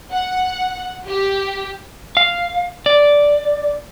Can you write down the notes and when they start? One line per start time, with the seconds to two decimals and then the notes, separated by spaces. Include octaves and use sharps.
0.12 F#5
1.09 G4
2.17 F5
2.86 D5